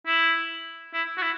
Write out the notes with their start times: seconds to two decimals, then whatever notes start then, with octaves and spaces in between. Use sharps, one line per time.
0.07 E4
0.94 E4
1.18 F#4
1.22 E4